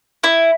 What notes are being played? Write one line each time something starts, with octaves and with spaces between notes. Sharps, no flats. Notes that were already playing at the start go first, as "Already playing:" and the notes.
E4